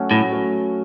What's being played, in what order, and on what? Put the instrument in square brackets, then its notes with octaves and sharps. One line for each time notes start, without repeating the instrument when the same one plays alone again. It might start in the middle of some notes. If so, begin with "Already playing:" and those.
Already playing: [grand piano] F#3 A3 C#4 F#4
[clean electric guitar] A2 [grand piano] F#3
[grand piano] A3 C#4 F#4